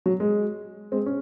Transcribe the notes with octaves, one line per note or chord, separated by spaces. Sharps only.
F#3
G#3
G#3 C4
C#4